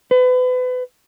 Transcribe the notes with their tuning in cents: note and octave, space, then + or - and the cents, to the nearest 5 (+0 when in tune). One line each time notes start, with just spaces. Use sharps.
B4 +35